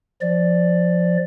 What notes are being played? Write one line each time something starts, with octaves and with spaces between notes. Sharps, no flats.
F3 D5